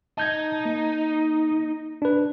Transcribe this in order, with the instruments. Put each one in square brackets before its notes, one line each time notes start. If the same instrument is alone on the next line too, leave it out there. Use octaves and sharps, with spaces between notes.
[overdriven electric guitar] D#4 [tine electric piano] A5 G6 G#6
[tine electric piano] A#3
D4 B4